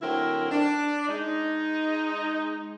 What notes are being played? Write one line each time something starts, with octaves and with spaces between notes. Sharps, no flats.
D3 F#3 A3 C4 E4 A#4
D4
G#3 D#4